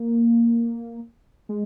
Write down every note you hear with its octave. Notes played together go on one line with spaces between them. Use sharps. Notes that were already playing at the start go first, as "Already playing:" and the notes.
Already playing: A#3
G#3